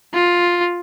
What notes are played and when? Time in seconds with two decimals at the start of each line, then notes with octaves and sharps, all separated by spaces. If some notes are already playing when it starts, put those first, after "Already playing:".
0.14 F4